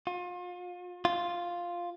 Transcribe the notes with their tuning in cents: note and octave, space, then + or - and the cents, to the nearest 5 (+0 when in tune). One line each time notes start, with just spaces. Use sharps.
F4 +35
F4 +0